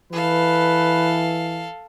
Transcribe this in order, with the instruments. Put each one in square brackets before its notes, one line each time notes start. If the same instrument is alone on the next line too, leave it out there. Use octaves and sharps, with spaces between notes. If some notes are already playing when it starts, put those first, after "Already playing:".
[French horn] E3 [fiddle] A4 F5 [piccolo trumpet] B4